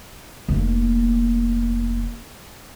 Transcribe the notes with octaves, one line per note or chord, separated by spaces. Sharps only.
F1 A#3